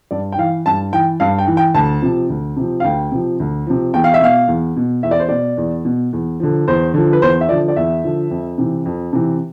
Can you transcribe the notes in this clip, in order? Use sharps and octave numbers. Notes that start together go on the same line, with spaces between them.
G2 D5
G5
E3 F5
G2 A5
E3 G5
G2 F5
G5
E3
G5
D2 A5
C3 F3
D2
C3 F3
F5
D2 G5
C3 F3
D2
C3 F3
E2 G5
F5
E5
B2 F5
E2
B2
E2 E5
D5
C5
B2 D5
E2
B2
E2
D3 F3
E2 C5
D3 F3
B4
E2 C5
E5
D3 F3 D5
D5
E2 E5
D3 F3
F2
C3 E3
F2
C3 E3